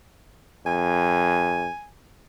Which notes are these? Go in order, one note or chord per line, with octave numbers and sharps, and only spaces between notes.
F2 G#5